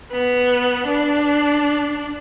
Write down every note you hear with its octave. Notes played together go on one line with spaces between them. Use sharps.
B3
D4